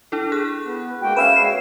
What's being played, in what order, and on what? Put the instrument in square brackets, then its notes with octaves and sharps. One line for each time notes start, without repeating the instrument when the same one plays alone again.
[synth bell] D4 E4 A4
G#4 F#6
[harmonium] B3
[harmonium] G#3 A#3 F#4 [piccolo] G5
[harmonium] C#4 G#5 [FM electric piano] B4 E5 F5 [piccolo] E7
[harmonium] G#3 F#4 [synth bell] C7